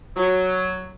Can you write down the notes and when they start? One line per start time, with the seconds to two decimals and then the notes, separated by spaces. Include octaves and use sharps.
0.15 F#3